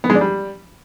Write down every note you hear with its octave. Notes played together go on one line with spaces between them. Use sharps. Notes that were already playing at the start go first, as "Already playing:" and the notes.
B3
G#3
D4
G3